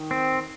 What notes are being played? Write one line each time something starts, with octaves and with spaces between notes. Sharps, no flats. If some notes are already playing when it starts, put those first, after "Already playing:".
Already playing: D#3
C4